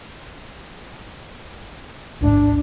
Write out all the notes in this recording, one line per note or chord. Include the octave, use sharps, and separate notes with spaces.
A1 D2 G#2 D4